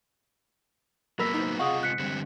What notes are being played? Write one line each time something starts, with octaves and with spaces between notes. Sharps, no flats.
F#3 A#3 B3 A#4 B5 E6 B6
D#4 A#4 C5
C3 F4 G#4 D#5 F5 F#5 C#6 D#6
G#2 F#6 B6 C#7
D3 G3 C4